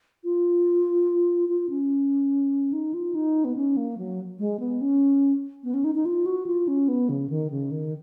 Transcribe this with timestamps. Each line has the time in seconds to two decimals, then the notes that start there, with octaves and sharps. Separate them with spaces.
0.24 F4
1.49 F4
1.70 C#4
2.73 D#4
2.94 F4
3.15 D#4
3.45 B3
3.56 C#4
3.77 A#3
3.98 F#3
4.39 G#3
4.60 B3
4.81 C#4
5.64 B3
5.74 C#4
5.84 D#4
5.95 D#4
6.05 F4
6.26 F#4
6.47 F4
6.68 C#4
6.88 B3
7.09 C#3
7.30 D#3
7.51 C#3
7.71 D#3